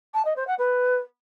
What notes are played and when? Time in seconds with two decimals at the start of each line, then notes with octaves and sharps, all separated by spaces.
0.14 A5
0.25 D#5
0.36 C5
0.47 F#5
0.58 B4